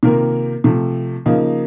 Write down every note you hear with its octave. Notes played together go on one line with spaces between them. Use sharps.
C3 D#3 A#3 F4 A#4
C3 F3 A3
C#3 F3 A#3 D#4